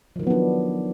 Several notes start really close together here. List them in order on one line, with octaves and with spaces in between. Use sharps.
F3 D#3 F#3 B3 D4